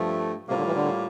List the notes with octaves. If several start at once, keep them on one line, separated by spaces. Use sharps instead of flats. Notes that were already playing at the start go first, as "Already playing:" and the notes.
Already playing: G2 F3 A3
A2 C3 G3 A#3 F4
D3
E3
D3